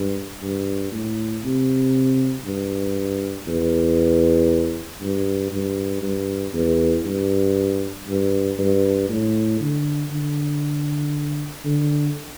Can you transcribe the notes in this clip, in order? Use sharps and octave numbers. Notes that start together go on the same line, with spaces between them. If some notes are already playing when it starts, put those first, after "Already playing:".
Already playing: G2
G2
A2
C3
G2
E2
G2
G2
G2
E2
G2
G2
G2
A2
D3
D3
D3